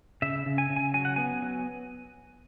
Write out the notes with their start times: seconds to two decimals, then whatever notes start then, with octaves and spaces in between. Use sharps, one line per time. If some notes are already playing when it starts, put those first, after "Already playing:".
0.22 C#3 E5
0.46 C#3
0.58 G#5
0.70 C#3
0.76 G#5
0.94 F#3 G#5
1.05 F#5
1.16 B3 G#5
1.42 F#3